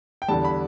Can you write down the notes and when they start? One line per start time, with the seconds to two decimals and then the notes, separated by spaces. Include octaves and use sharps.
0.22 G5
0.28 E2 D3 G3 A5
0.45 B5